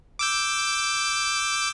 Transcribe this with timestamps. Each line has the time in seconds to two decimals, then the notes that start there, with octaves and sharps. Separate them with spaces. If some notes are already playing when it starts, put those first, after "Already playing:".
0.19 D6 E6 G6